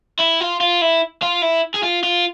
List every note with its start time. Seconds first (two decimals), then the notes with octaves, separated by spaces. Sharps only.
0.20 E4
0.41 F4
0.61 F4
0.82 E4
1.23 F4
1.43 E4
1.75 G#4
1.84 F4
2.04 F4